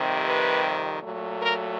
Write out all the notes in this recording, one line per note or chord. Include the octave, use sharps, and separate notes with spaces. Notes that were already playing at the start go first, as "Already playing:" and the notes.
Already playing: F2 C3 D#3 G3
B4
A#2 F#3 A3
A#4